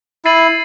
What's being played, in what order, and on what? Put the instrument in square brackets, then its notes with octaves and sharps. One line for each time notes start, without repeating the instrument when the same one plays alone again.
[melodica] E4 [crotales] A6 C7 D#7 F#7